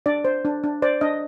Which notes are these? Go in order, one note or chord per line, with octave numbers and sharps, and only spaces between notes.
D4 D5
C5
D4
D4
C5 D5
D4 D#5